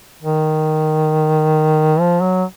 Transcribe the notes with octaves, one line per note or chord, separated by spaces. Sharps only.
D#3
F3
F#3